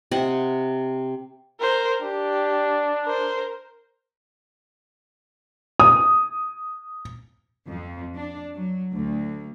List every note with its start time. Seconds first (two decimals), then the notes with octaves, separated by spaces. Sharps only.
0.11 C3 D#5 F#5
1.60 A#4 C5
2.01 D4 G4
3.04 A#4 C5
5.80 D#6
7.67 F2
8.15 D4
8.54 F#3
8.93 D2